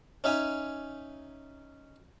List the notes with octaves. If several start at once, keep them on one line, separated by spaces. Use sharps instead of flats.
C#4 D#4 E5 G#5